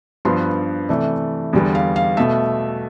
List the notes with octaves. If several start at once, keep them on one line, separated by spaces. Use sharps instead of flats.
G2 F3 B3 C6
C3 E3 A3 D5
E2 D3 G3 B3
F5
F5
B2 A3 E5